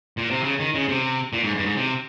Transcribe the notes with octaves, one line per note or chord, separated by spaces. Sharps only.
A#2
C3
C#3
D#3
C#3
C3
A#2
G#2
G2
G#2
C3